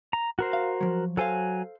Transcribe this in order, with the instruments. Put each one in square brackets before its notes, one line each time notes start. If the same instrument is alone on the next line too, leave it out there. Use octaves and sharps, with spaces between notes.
[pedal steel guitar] A#5
F#4 A#4 C5
[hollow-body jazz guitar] F5
F3 F#3
[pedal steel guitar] F#3 G#5 [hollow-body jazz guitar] A4 C5 F5